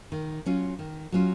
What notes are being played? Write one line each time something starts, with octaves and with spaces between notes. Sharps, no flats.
D#3
F#3 C#4 F4
D#3
F#3 C#4 F4